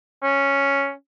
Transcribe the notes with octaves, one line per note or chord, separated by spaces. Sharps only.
C#4